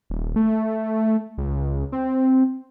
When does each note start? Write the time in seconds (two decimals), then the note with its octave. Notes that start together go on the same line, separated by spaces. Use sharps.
0.10 D#1
0.36 A3
1.38 C#2
1.92 C4